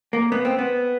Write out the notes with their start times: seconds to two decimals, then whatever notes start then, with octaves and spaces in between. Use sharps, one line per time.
0.13 A#3
0.32 B3
0.45 C4
0.59 B3